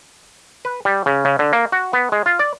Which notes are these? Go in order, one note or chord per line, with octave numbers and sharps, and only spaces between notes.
B4
G3
C#3
C#3
D3
A#3
F#4
B3
G#3
F4
D5